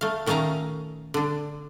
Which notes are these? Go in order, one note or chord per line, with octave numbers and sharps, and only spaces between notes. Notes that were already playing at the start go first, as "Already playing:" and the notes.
A3 F5
A#2 D#3 A3 C#4 F5 A#5
D3 D4